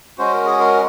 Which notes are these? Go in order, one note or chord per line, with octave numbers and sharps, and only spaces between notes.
G#3 C#4 F#4 C5
A#4
G#4
A#4